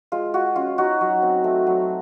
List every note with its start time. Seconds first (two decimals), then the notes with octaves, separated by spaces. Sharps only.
0.12 G#3 F4
0.34 F4 F#4
0.56 C#4 F4
0.78 D#4 F#4
1.01 F#3
1.22 C4
1.44 A3
1.67 F#3